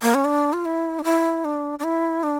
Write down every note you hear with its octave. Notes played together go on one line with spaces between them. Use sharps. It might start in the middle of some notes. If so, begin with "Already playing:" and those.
A#3
C#4
D4
F4
E4
D4
E4
D4
D4
E4
D4